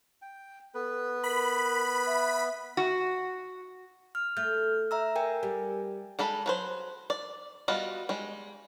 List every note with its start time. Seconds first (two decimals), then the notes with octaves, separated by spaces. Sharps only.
0.22 G5
0.74 B3 A4 B4
1.23 A#4 B5
2.07 E5
2.77 F#4
4.15 F6
4.37 A3 F6 G6
4.91 E5 A#5 E6
5.16 A#4 G5 G#5
5.43 G3
6.19 G3 G#3 A4 B5
6.46 F#3 B4 C5
7.10 D5
7.68 G3 B3 F4 F#4 D#5
8.09 G3 G#3